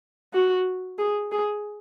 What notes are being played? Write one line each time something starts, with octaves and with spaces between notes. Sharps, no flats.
F#4
G#4
G#4